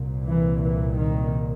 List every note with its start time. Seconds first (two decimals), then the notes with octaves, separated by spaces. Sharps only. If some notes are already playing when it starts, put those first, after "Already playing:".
Already playing: C2 A#2
0.27 E3
0.62 E3
0.97 D#3